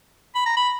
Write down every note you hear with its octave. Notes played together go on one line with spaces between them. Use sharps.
B5
A#5
B5